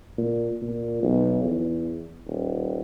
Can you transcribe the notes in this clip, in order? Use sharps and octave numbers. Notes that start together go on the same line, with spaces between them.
A#2
A#2
B1
E2
D#1